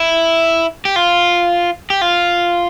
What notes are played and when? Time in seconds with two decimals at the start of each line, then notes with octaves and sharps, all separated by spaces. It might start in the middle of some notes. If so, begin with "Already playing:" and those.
Already playing: E4
0.85 G4
0.96 F4
1.90 G4
2.01 F4